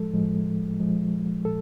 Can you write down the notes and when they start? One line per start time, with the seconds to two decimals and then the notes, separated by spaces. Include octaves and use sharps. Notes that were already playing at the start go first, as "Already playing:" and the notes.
Already playing: A2 F3 G#3 A4
0.13 A2 F3 G#3
0.80 A#2 F3 G#3
1.45 A#2 A4